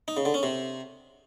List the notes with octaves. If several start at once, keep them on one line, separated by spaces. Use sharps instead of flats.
D#4
C#3
D3
C#4
C3